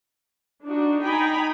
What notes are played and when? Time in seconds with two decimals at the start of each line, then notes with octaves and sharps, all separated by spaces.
0.64 D4 D#4 F#4
1.04 D#4 D#5 G5 G#5 A#5 B5